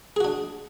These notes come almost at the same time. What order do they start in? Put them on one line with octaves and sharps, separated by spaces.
G#4 F#4 D4